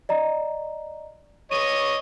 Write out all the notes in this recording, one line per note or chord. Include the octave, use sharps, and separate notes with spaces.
D5 D#5 A#5
C#5 D#5 D#7